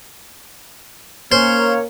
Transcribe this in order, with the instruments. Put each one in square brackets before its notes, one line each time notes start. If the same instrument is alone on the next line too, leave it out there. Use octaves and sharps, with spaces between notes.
[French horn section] A#3 [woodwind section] C#4 C#5 F6 [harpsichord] C5